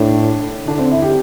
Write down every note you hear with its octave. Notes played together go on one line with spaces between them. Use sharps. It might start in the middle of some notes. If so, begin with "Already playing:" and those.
Already playing: A2 D4
D3 D4
C4
E4
G4